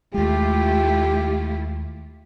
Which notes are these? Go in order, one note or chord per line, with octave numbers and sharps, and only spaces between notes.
D#2 G#3 A3 E4 F4 G4